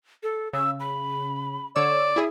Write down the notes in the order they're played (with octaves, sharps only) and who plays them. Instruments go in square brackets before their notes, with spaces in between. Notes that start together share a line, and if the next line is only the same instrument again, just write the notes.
[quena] A4
[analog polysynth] C#3 [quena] E6
[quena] B5
[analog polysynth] D3 C#5 E6 [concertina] D5
[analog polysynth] E4 G#4 [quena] E5